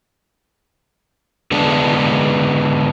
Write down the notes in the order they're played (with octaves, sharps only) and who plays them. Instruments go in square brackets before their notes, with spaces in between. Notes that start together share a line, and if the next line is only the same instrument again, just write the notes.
[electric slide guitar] D3 G#3 B3 D4